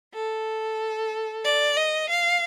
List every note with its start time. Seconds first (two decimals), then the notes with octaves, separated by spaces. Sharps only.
0.14 A4
1.45 D5
1.77 D#5
2.10 F5